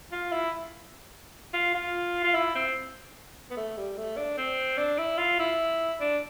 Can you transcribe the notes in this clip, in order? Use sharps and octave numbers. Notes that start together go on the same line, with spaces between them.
F4
E4
F4
F4
F4
E4
C4
B3
A3
G3
A3
D4
C4
D4
E4
F4
E4
D4